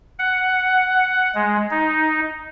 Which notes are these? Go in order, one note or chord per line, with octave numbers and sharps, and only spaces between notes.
F#5
G#3
D#4